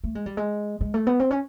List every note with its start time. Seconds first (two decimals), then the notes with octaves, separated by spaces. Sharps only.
0.04 A3
0.15 G#3
0.26 G3
0.37 G#3
0.81 G#3
0.94 A3
1.07 B3
1.20 C4
1.31 C#4